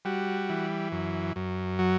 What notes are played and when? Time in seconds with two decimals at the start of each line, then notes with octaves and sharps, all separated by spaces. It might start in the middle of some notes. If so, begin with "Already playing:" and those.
0.05 G3 F#4
0.49 E3
0.92 F#2
1.36 F#2
1.79 F#3